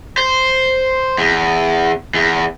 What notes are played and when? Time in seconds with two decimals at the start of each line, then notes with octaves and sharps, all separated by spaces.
0.18 C5
1.18 E2
2.14 E2